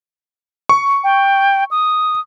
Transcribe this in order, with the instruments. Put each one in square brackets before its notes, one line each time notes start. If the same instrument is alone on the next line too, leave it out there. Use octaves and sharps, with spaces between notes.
[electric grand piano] C#6
[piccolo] G5
D#6